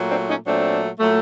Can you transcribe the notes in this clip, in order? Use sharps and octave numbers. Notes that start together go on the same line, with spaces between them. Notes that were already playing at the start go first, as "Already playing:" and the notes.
Already playing: A#2 F#3 A3
C4 D4
C#4 D#4
A#2 F#3 A3 C4 D4
A#2 F#3 A3